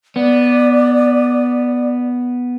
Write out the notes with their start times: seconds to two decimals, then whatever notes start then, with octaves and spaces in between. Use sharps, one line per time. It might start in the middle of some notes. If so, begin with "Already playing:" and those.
0.16 B3 D5